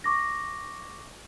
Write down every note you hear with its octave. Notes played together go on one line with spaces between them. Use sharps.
C#6 D6 A#6